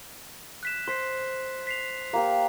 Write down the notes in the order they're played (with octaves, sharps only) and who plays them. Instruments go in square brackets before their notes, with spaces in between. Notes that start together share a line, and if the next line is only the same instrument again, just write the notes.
[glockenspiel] F#6 B6 E7
[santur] C5 [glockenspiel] C6 B6 C7
[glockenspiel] B6 C7 F7
[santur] A#3 G4 F5